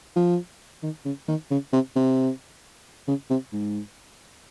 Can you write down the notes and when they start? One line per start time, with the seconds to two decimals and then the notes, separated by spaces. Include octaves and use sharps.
0.16 F3
0.83 D#3
1.05 C#3
1.28 D#3
1.51 C#3
1.73 C3
1.96 C3
3.08 C#3
3.30 C3
3.53 G#2